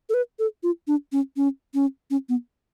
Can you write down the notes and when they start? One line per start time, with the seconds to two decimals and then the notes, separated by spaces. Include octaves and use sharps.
0.09 A4
0.14 B4
0.39 A4
0.63 F4
0.87 D4
1.12 C#4
1.37 C#4
1.74 C#4
2.10 C#4
2.29 B3